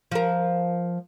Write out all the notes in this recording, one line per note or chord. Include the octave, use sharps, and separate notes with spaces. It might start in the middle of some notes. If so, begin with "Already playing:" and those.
F3 A#4